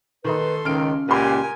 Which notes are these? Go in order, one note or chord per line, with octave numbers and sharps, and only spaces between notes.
D#3 D#4 A4 B4 C6
C#2 D#3 C#4 F6 D7
C#2 A#2 G4 A#4 B4 F#5 G#5 C6